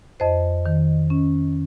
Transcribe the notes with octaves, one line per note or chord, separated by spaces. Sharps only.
F2 C5 D#5
D#3
C#4